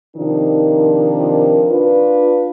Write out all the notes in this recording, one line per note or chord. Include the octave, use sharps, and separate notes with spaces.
C3 D#3 F3 D4 D#4 A#4
D4 F4 B4